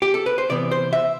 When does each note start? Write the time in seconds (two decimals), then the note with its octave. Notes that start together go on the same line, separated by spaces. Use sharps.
0.02 G4
0.14 A4
0.26 B4
0.38 C5
0.50 C3 E3 B3 D5
0.71 C5
0.93 E5